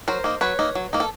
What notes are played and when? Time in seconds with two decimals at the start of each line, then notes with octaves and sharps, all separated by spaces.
0.08 F#3 A#4 C5
0.24 A#3 D#4
0.41 F#3 B4 C#5
0.59 A#3 D#4
0.75 F#3
0.93 A#3 D#4
1.00 A4